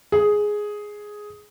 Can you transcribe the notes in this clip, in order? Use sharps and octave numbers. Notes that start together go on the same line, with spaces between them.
G#4